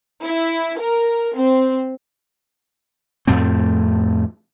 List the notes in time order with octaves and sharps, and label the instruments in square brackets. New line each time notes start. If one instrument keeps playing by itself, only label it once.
[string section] E4
A#4
C4
[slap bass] F2 A2 A3 C4